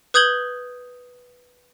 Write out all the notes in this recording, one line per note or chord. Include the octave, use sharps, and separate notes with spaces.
B4 D#6 G6 G#6 F#7 G7